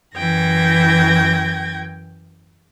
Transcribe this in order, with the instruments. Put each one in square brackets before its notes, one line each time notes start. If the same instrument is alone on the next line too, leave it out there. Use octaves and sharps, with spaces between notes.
[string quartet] F#2 E3 G5 G#6 A#6